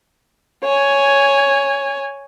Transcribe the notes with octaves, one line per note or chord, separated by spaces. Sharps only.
C#5 G#5